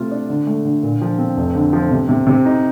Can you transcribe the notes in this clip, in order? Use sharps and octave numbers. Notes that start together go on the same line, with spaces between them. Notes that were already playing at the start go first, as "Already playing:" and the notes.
Already playing: C3 A3 F4
D4
D3
A3
D3
A#2
F3
C4
F1
D3
F3
C3
C3
C3
D#4